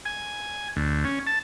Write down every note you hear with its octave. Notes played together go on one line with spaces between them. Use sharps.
G#5
D2
C#4
A5